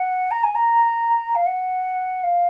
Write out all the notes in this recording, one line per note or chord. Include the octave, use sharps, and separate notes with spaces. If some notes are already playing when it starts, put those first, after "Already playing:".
Already playing: F#5
A#5
G#5
A#5
F5
F#5
F5